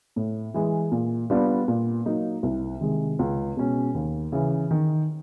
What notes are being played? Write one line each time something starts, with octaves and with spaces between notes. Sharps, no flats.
A2
E3 G#3
A#2
G3 B3 D4 F4
A#2
F#3 A#3 D#4
C2
C3 D#3 G#3
C#2
B2 G#3 C#4
D#2
C#3 E3
D#3